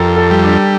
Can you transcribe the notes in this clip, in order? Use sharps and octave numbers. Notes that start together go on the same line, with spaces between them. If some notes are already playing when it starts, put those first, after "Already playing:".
Already playing: F2 G4 A4 A#4
A4
G3
D4